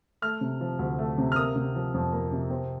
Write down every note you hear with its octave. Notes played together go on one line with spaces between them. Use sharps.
A3 F6
C3
F3
D2
A3
C3
F6
A#3 D#6
C3
F3
F2
A#3
C3
C4